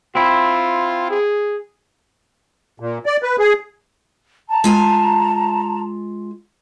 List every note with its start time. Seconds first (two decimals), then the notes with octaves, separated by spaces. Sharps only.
0.15 C4 E4 F4
1.10 G#4
2.80 A#2
3.06 D5
3.23 B4
3.39 G#4
4.49 A5 A#5
4.64 G#3 F4 G#5